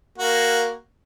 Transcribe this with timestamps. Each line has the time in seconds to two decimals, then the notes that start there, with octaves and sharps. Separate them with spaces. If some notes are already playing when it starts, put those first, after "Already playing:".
0.18 A#3 F#4